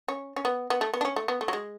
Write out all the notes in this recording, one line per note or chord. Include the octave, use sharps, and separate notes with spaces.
C#4
C#4
B3
B3
A3
B3
D4
C#4
A3
B3
A3
F#3
G#3